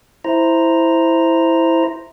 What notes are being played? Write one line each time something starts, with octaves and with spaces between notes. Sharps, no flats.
E4 C5 A#5